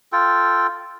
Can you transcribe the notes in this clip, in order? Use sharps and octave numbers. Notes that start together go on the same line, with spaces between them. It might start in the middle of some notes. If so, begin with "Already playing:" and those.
F4 A4 G5